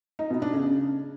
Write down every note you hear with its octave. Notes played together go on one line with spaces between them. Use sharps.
D#4
B2
D4
C#3